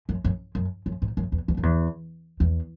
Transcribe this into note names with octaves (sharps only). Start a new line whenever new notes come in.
F#2
F#2
F#2
F#2
G#2
F#2
E2
E2
F#2
E2
E2